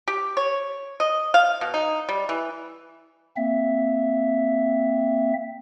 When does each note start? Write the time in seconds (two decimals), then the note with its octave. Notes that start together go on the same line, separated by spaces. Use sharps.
0.08 G4
0.37 C#5
1.00 D#5
1.34 F5
1.61 B2
1.74 D#4
2.09 G3
2.29 E3
3.37 A#3 C4 E5